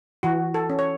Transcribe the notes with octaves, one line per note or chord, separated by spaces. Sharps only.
E3 F#4
A4
C#4
C#5